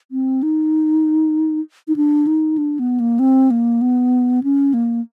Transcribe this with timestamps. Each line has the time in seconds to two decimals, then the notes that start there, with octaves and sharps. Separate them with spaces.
0.11 C4
0.43 D#4
1.88 D#4
1.96 D4
2.27 D#4
2.58 D4
2.79 B3
3.00 A#3
3.19 C4
3.51 A#3
3.81 B3
4.43 C#4
4.74 A#3